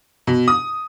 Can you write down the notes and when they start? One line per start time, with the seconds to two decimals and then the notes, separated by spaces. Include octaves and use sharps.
0.27 B2
0.48 D#6